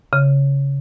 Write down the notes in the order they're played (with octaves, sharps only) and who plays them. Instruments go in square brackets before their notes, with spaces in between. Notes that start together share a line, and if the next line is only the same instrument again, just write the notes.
[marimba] C#3